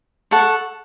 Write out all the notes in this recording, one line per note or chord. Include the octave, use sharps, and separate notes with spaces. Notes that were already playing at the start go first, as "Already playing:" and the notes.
A4 F#5 C#6